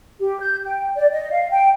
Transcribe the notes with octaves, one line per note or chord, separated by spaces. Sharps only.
G4
G6
G5
D5
D#5
F5
G5